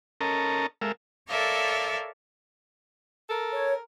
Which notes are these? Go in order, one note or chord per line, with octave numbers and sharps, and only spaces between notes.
C#4 A4 A#4 D#5 A5 A#5
G#3 A4 A#4 E5 F5
A4 A#4 C#5 D5 E5 F5
A4 A#4
C#5